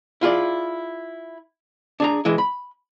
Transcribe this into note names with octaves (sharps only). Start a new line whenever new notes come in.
E4 F4 G#4 D5
D4 G#4 A#5
E3 G#3 E4
B5